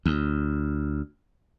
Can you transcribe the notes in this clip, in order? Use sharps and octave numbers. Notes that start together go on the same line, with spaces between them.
D2